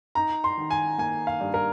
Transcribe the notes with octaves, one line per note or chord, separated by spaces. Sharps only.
D#4 A#5
C6
D#3
G#5
A#3 G#5
F5
G2
A#4